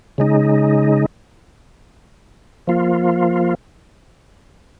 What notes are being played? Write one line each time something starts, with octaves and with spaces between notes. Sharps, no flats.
C#3 G#3 D#4
F3 A#3 F4